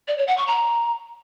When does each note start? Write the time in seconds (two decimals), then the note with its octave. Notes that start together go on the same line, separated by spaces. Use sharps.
0.08 D5
0.18 C#5
0.28 F#5
0.38 C#6
0.47 A#5